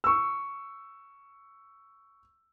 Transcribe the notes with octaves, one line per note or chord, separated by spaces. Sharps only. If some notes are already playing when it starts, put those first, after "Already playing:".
C#6 E6